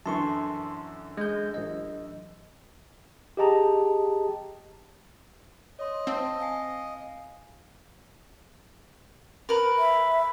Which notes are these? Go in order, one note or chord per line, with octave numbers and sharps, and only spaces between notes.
F#2 D3 E3 A5 C6 C#6
G#3 G6
A1 D#5
G4 G#4 D#5 G5 A5 A#5
C#5 D#5 C6
C4 F5 A5
F5 G#5 C7
A#4 B4
E5